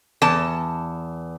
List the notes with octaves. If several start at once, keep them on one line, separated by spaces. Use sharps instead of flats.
E2 A5